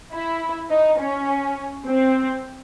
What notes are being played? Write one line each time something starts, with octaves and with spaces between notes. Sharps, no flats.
E4
D#4
C#4
C4